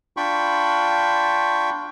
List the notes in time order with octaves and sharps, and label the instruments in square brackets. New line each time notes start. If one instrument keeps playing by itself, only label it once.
[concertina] D4 F4 G5 B5 C#6